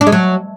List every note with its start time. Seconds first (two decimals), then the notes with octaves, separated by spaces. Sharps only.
0.01 D4
0.07 G#3
0.12 F#3